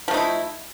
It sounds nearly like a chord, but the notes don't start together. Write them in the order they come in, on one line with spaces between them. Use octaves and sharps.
F3 A3 D#4 E4